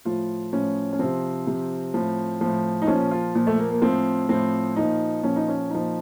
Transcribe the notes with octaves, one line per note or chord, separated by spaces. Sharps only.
A2 F3 F4
A2 F3 C#4
C#4
C3 F3 C4
C3 F3
A2 F3
A2 F3
D#4
A#2 F3 C#4
F4
A#2 F3
A3
A#3
A#3
A2 F3 C4
A2 F3 C4
A#2 F3 D#4
A#2 F3 C#4
D#4
C#4
A#2 F3 D#4